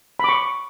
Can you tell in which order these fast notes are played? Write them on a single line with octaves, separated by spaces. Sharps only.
B5 D6 C#6